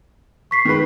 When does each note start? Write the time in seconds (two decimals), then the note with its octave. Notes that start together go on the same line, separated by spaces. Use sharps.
0.51 C#6 B6 C7
0.65 D#3 G#3 B4